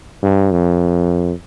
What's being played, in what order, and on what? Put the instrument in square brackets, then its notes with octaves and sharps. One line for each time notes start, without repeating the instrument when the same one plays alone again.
[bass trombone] G2
F2